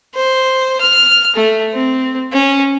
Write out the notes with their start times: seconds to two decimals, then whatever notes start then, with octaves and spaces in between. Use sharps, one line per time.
0.15 C5
0.80 F6
1.35 A3
1.74 C4
2.33 C#4